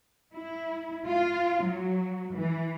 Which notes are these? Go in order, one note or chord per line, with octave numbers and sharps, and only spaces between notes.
E4
F4
F#3
E3